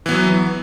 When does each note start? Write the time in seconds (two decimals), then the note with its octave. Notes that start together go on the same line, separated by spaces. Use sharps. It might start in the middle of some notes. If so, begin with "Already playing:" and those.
0.06 E3
0.09 B3
0.11 F#3